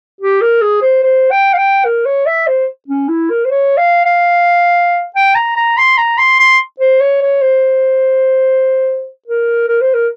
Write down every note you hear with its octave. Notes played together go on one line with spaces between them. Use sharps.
G4
A#4
G#4
C5
C5
G5
F5
G5
A#4
C#5
E5
C5
C#4
E4
A#4
C5
C#5
F5
F5
G5
A#5
A#5
C6
A#5
C6
C6
C5
C#5
C#5
C5
A#4
A#4
C5
A#4